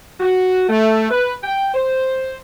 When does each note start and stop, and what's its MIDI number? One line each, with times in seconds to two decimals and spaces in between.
0.20 0.66 66
0.69 1.10 57
1.11 1.35 71
1.44 1.70 79
1.74 2.38 72